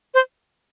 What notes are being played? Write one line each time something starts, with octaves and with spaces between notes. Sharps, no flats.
C5